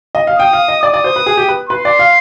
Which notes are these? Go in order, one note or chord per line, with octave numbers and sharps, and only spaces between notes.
D#5
F5
G5 D#6
F5
D#5
D5 D#6
D5
C5
B4
G#4
G4
B4
B4 C6
D5
F5